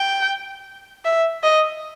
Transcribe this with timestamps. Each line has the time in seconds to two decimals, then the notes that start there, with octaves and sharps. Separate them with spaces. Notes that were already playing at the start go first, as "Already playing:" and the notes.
Already playing: G5
1.05 E5
1.43 D#5